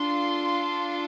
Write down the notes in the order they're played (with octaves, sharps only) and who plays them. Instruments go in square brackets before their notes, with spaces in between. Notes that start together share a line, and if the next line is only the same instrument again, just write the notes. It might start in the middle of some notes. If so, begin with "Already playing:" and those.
Already playing: [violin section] D4 F4 A4 C6